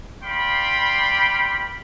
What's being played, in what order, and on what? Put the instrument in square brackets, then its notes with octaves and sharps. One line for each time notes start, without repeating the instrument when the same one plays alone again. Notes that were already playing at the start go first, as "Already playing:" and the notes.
[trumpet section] D5 F5 G5 B5 C6